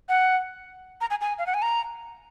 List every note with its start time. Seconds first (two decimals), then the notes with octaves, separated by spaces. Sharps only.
0.09 F#5
1.01 A#5
1.10 G#5
1.21 G#5
1.39 F5
1.47 F#5
1.54 G#5
1.62 A#5